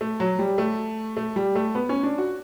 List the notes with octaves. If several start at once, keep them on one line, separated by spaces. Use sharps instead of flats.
A3
F#3
G3
A3
A3
G3
A3
B3
C#4
D4
F#4